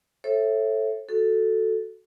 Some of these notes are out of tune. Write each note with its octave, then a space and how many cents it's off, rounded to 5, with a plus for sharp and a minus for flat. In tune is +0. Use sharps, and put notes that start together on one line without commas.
A4 +0 C#5 -45 E5 +0
F#4 +0 A4 +0